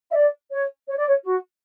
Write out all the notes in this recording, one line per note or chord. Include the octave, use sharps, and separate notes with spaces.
E5
D5
C#5
C#5
D5
C#5
F#4